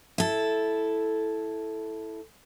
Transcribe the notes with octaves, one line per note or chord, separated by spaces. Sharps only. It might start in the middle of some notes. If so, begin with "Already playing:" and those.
E4 A4